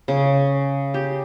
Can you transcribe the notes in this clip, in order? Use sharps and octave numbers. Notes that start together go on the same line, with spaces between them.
C#3
G4